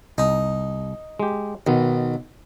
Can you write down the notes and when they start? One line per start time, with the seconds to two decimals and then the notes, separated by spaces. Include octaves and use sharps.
0.18 C2 D#4
1.20 G#3 G4
1.67 B1 D#3 B3